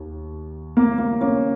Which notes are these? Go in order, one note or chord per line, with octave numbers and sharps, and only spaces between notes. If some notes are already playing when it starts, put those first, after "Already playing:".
Already playing: D#2
A#3
A#3
A#3 C#4